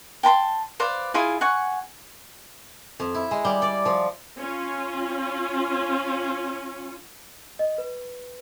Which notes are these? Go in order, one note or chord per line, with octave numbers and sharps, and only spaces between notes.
G5 A5 B5 C6
B4 C5 D5 F5
E4 F4 G#4 F5
F#5 G#5 C#6
F2
E4
G#3
G3
D5
F3
C#4 F4
D#5
B4